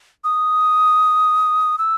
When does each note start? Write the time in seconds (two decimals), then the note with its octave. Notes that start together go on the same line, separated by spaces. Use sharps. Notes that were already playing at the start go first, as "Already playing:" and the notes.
0.24 D#6
1.78 E6